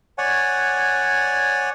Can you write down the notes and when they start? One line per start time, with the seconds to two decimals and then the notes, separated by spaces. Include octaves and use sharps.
0.18 C#5 D5 F#5 G#5